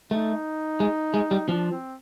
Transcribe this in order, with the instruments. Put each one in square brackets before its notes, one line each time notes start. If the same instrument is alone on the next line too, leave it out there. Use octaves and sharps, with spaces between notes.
[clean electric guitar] A3 [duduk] D#4
[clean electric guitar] G#3
G#3
G3
[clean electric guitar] F3 [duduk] D4
[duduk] C4